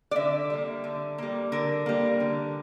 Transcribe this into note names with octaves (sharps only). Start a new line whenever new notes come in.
D5
D3 E5
G3 A#3
D3
G3 A#3
D3 A#4
G3 A#3
D3